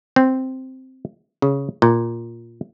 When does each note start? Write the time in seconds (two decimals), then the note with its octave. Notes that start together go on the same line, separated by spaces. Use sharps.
0.16 C4
1.42 C#3
1.82 A#2